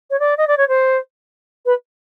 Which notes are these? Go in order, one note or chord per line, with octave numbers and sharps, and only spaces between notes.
C#5
D5
D#5
D5
C#5
C5
B4